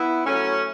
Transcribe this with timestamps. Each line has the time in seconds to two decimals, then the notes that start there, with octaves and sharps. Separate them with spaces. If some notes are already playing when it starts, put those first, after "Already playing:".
Already playing: B3 E4
0.26 F#3 A3 C#4